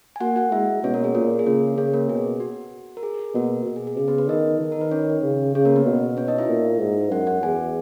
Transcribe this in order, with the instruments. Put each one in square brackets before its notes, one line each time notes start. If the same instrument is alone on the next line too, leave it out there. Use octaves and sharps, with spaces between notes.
[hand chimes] G#5
[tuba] A#3 [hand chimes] F#4 F#5
[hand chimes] F#4 F#5
[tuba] G#3 [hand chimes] E4 E5
[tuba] B2 [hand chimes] C#4 C#5
[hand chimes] A#3 A#4
G#4
[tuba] A#2 [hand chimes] A#3 A#4
[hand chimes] G#4
[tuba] C#3 [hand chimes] A#3 A#4
[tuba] C#3 [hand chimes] C#4 C#5
[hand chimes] A#3 A#4
[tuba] B2 [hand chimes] G#4
[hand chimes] F#4
A#4
G#4
G#4
[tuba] B2 [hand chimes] A#3 A#4
[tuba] B2
[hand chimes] G#4
G#4
[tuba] C#3 [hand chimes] G#4
[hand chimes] B3 B4
B3 B4
[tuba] D#3 [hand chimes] D#4 D#5
[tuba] D#3
[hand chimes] A#4
B4
C#4 C#5
[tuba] C#3
[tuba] C#3 [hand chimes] C#4 C#5
[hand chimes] A#3 A#4
B3 B4
[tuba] B2
[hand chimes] C#4 C#5
D#4 D#5
E4 E5
[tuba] A#2
G#2
[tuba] F#2 [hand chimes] F#4 F#5
[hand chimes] F#4 F#5
[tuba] E2 [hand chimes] G#4 G#5